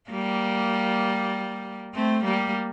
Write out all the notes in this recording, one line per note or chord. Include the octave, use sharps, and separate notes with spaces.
G3 A#3
A3 C4
G3 A#3